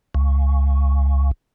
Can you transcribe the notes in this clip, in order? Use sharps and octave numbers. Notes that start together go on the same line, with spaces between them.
C#2